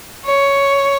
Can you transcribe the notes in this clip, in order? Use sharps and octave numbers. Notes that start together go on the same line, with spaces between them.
C#5